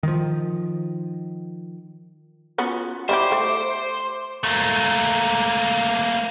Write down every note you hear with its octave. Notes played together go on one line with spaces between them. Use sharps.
D#3 F3
B3 C#4 F4 F#4
G3 E4 G4 C5 D6
A3
A3 A#3